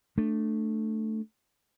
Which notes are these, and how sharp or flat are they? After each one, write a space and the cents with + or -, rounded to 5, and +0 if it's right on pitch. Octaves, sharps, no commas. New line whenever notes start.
A3 +0 D4 +15